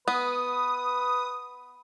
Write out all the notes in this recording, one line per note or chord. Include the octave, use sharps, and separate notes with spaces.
B3 B4 D#6